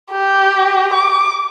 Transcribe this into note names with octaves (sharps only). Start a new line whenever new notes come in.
G4
D6